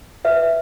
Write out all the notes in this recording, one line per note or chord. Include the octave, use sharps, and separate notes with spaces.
B4 E5